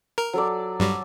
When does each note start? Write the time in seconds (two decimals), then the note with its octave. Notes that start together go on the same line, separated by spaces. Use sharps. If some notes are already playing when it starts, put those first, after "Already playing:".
0.18 A#4
0.33 F#3 A4 D5
0.80 G2 F#3 G3